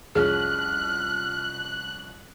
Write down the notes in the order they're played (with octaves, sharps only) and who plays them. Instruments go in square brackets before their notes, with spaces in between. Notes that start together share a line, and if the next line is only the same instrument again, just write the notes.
[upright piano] C2 F2 C#4 [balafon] G#4 [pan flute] F6 [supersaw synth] F#6